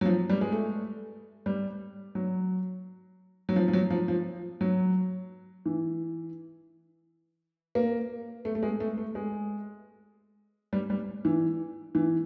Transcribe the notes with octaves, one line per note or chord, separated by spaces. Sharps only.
F#3
F3
G3
G#3
A3
G3
F#3
F#3
F3
F3
F#3
F3
F3
F#3
E3
A#3
A3
A3
G#3
A3
A3
G#3
G3
G3
E3
E3